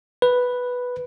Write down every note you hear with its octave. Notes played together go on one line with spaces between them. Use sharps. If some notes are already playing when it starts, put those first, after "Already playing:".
B4